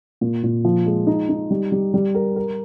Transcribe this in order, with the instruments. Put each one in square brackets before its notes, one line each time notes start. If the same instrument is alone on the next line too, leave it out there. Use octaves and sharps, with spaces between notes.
[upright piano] A#2
A#2
F3
G#3
D#4
D#4
G3
G3
G3
A#4
A#4